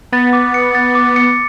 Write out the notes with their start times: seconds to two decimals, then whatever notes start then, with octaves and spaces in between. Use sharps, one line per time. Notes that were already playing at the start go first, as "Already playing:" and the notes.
0.12 B3 A6
0.33 D6
0.54 C#7
0.75 A6
0.95 D6
1.16 C#7